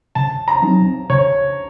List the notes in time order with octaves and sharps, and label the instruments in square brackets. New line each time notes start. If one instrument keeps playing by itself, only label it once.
[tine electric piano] C#3 [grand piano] A5
[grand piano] A#5
[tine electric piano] F#3 C4 D#4
[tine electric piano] C#3 [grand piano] C#5